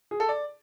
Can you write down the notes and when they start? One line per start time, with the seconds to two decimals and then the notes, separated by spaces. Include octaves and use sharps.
0.11 G#4
0.20 A4
0.29 D5